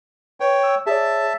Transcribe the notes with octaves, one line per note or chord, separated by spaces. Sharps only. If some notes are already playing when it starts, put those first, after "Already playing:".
B4 C#5 G5
E6
G#4 C#5 D5 E5 A5